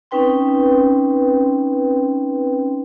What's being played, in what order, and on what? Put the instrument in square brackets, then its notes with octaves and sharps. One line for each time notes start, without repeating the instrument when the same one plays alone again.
[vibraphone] C4 C#4 D#4 B4 G5 C6